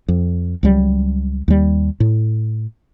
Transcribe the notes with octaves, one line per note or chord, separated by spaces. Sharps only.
F2
C#2 F#3 G3
D#2 G3
A2